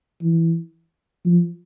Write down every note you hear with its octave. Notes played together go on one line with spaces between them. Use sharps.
E3
F3